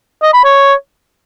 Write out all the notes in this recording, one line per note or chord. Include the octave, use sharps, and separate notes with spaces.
D#5
B5
C#5